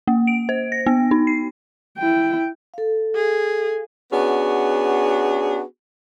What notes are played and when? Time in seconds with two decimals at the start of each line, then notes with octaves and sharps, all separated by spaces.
0.07 A#3
0.27 D7
0.49 C5
0.72 A#6
0.86 B3
1.11 D#4
1.27 C7
1.98 E4 G5
2.74 A4 F5
3.15 G#4
4.12 B3 C#4 D4 F#4 G#4